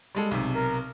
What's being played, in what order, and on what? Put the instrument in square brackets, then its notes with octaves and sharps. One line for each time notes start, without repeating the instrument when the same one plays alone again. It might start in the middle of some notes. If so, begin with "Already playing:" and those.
[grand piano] G3 G#3 A4
B1 C3
[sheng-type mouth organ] A#4